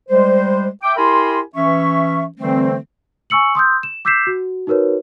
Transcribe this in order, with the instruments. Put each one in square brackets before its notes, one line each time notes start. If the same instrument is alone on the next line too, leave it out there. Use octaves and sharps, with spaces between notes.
[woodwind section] G3 G#3 C5
E5 G5 D6
E4 G4 A#4 G#5 B5 C6
E3 C#4 E5 C#6
D3 E3 G3 A3 C4
[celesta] G#5 C#6 E6 C#7 F#7
C6 D#6 E6 G6
E7
D6 E6 G6 B6 C7 E7
F#4
D#4 F#4 A#4 B4 C#5